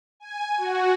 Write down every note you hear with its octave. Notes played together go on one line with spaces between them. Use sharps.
G#5
F#4